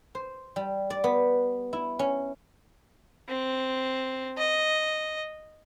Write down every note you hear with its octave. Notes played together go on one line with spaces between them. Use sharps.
C5
G3
D5
B3
E4
C#4
C4
D#5